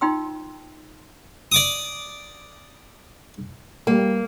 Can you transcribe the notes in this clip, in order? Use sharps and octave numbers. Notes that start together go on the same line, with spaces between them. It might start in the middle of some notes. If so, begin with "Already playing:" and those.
D#4 F4 G5 C6 E6
D5 D6 D#6
G3 A#3